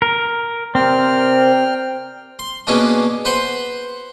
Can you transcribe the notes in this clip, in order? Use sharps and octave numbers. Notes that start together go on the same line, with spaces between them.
A#4
C3 C4 A#4 D5 G5 F6
C6
B2 G#3 A#3 C#4 D4
B4 C5 F#5 C6